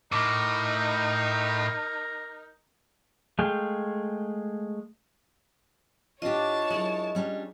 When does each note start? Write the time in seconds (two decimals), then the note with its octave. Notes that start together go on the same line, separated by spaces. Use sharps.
0.12 A2 D#4 A#4 D6
3.39 G#3 A3 G#4 F5 G5
6.22 A2 D4 F4 G4 C#5 D#5 A5
6.70 F#2 G#3 E4
7.15 G3 C#4 D4